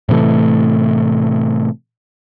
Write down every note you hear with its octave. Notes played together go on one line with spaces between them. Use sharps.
A2 C3 E3 A3